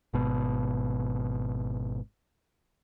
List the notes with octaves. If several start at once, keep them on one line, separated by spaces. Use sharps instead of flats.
G#1 B2